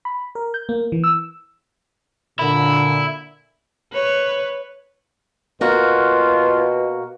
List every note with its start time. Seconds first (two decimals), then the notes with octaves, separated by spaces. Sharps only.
0.05 B5
0.35 A#4
0.54 G6
0.69 A#3
0.92 E3
1.04 E6
2.39 A#2 D3 E4
3.93 B4 C#5
5.61 B2 A#3 F4 F#4